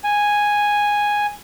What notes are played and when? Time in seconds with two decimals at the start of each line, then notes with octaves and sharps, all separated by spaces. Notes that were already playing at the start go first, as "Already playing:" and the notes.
0.04 G#5